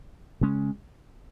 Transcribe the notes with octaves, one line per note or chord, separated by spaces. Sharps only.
C#3 G#3 C#4